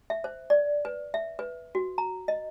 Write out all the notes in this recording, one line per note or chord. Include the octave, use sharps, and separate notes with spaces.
E5
C5
D5
B4
E5
B4
F#4
A#5
D#5